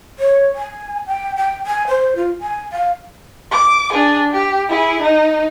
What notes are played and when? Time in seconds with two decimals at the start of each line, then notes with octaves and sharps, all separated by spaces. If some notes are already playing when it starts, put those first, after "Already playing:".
0.19 C#5
0.55 G#5
1.07 G5
1.36 G5
1.66 G#5
1.87 C5
2.16 F4
2.40 G#5
2.72 F5
3.51 D6
3.93 D4 G#4
4.32 G4
4.69 E4 G#4
5.02 D#4